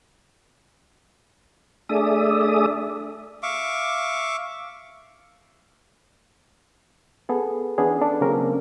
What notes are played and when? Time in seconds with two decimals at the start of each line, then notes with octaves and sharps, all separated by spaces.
1.89 A3 D4 G#4 D5 E5 D#6
3.43 E5 F5 C#6 D6
7.29 B3 G#4 A4
7.78 E3 B3 C#4 D4 G#4
8.02 D4 A4
8.21 C#3 F#3 A#3 C4 C#4 A#4